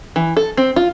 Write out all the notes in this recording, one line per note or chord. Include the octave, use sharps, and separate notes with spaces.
E3
A4
C4
F4